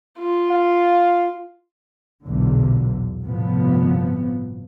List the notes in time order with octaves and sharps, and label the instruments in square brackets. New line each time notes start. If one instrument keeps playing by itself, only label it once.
[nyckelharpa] F4
[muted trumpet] F5
[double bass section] B1 E2 A#2 D3
G1 A2 C3 F3 B3